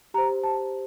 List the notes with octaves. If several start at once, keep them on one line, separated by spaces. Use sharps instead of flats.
G4 C5 A#5
A5